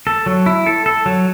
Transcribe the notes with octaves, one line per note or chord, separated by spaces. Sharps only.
A4
F#3
E4
A4
A4
F#3